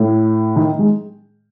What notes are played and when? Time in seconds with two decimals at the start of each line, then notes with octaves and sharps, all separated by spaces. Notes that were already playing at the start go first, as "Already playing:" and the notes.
Already playing: A2
0.56 D#3
0.79 G#3